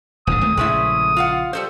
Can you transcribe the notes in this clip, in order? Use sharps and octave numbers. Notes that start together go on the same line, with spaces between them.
D#1 A2 D3 D#6
G#1 D2 A3
A#1 C#3 G#3 A3 E4
F4 F5 F#5
G3 A4 C5